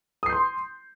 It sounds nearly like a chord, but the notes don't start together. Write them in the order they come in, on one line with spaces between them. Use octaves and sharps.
D#6 C7 G6 C6